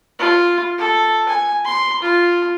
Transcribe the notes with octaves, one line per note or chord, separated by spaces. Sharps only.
F4
A4
G#5
C6
F4